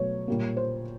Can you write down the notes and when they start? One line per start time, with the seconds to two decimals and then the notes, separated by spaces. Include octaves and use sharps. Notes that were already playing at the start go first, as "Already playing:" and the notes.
Already playing: B2 F#3 A3 C#5
0.28 A#2 G3 A#3
0.57 C5